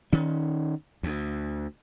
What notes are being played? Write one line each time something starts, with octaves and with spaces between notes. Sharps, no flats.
D#3 C#4
D2